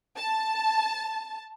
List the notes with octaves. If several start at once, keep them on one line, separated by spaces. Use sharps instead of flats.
A5